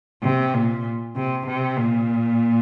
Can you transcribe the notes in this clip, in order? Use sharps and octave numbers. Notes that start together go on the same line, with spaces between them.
C3
A#2
C3
C3
A#2